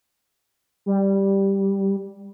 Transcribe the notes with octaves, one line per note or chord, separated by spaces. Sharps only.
G3